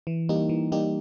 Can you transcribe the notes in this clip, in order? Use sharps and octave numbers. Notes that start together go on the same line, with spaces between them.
E3
G3 A#3 D#4 G4
E3
G3 A#3 D#4 G4